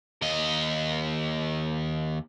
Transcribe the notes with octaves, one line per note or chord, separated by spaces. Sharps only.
D#2 D#5